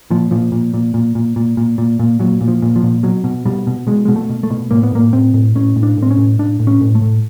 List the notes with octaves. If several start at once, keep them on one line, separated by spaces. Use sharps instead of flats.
A#2 F3
A#2 F3
A#2
A#2
A#2
A#2
A#2
A#2
A#2
A#2
A#2 F#3
A#2
F3
A#2
F3
A#2
B2 F#3
B2
B2 G3
B2
B2 G#3
B2 G#3
A3
B2
A3
B2
A2 A#3
B3
A2 A#3
A2 C4
A2
A2 C#4
A2
D4
A2
C4
C#4
A2
A2 D4
A2
C#4
A2
A3
A2